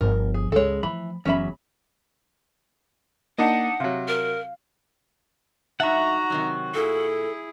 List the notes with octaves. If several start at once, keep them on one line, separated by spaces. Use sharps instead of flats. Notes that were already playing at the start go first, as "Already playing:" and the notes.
G1 F3 A#4
G#4
C#2 C#3 G#3 A4 C#5
E3 F3 A3 B5
F#1 E2 F#3 C#4 E5 B5
A#3 D4 D#4 D#5 F#5
C3 F#3 F5
A#4
G2 D#4 F#4 E5 F#5 A#5
C3 D#3 F#3
A#2 E4 G#4 A4